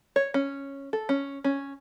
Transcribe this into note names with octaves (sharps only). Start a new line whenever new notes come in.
C#5
C#4
A4
C#4
C#4